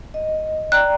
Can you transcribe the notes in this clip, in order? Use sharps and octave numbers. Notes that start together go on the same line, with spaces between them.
D#5
D5 G5 A#5 F#6